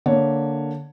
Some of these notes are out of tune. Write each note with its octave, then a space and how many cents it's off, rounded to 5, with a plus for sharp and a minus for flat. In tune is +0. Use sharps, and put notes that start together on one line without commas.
D3 +0 A#3 +0 C#5 +0